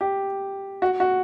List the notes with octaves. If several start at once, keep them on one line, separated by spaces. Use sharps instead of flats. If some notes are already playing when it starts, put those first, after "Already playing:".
G4
F#4
F#4